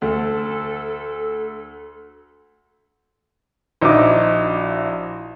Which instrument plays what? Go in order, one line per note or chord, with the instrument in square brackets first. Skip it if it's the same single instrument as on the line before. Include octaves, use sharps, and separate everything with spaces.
[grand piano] D2 [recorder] A4
[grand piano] A#1 D#4 E4 F#4 D6